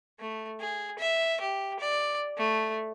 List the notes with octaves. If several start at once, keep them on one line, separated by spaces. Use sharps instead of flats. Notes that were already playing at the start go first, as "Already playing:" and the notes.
A3
G#4
E5
G4
D5
A3